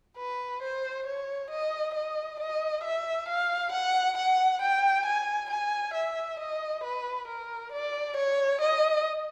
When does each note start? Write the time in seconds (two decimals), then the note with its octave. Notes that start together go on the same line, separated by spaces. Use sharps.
0.17 B4
0.63 C5
1.07 C#5
1.50 D#5
1.95 D#5
2.40 D#5
2.84 E5
3.29 F5
3.72 F#5
4.17 F#5
4.62 G5
5.06 G#5
5.50 G#5
5.94 E5
6.40 D#5
6.84 B4
7.28 A#4
7.72 D5
8.17 C#5
8.61 D#5